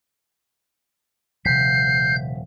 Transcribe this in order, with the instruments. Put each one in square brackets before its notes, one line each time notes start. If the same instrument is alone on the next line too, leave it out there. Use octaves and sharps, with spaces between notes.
[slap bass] D#1 F3 [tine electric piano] C3 B6 [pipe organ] G6 [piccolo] C7